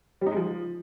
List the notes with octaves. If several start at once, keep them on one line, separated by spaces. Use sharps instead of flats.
G3
D#4
G#3
F3